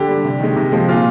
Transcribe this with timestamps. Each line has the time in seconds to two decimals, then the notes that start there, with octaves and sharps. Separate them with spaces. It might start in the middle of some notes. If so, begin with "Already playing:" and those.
Already playing: D3 G4
0.08 G3
0.25 C3
0.40 D#3 G#3
0.56 C3
0.72 F3 G#3
0.89 A#2 F4